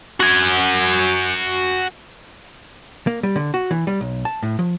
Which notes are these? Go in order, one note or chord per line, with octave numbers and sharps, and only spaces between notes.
F#4 G#5
A#3
G3
D3
F#4
E3
G3
B1
A5
A2
F3